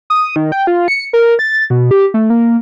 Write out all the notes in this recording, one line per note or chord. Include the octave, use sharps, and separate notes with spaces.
D#6
D#3
G5
F4
C#7
A#4
A6
B2
G4
A3
A#3